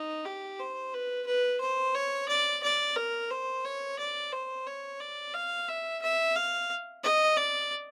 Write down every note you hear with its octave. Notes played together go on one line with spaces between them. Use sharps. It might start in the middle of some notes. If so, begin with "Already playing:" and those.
Already playing: D#4
G4
C5
B4
B4
C5
C#5
D5
D5
A#4
C5
C#5
D5
C5
C#5
D5
F5
E5
E5
F5
D#5
D5